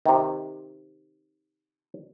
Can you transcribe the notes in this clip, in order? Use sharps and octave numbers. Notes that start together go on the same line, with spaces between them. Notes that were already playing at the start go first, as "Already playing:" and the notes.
C3 D#3